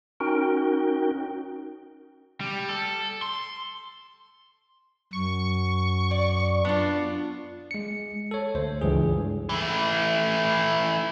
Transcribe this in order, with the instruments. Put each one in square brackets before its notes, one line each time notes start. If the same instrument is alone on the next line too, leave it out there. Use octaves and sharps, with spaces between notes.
[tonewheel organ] C#4 D#4 F#4 A#4 G5
[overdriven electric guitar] G3
A4
C6
[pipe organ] F#2 [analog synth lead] C#6
[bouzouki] D5
[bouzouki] B3 F4 [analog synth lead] D4
[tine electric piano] G#3 C#7
A4 C#5
D2 C5
C#2 G2 E3 G#4
[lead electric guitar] E3 A3